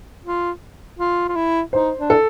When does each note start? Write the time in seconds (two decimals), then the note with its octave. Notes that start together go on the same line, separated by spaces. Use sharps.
0.25 F4
0.99 F4
1.29 F4
1.36 E4
1.73 D#4 C5
1.98 D4
2.10 A4